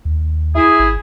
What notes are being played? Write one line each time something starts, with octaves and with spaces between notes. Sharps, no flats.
D#2
E4 G#4
G#1